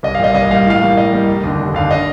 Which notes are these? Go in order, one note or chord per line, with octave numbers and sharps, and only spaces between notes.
C2 D#5
F5
A#2 G3 D#5
C2 D#5
A#2 G3 F5
A2 F5
G3 A#3
A2 D#5
G3 A#3
F1
D#2 D3
F1
D#2 D3 F5
D#5